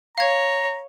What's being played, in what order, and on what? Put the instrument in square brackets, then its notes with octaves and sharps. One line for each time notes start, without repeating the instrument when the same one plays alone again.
[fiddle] C#5 [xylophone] F5 G#6 [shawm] A#5